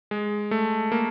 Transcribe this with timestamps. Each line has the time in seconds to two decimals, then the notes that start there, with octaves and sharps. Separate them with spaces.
0.11 G#3
0.51 A3
0.92 A#3